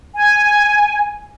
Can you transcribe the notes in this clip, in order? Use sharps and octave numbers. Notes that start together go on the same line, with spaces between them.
G#5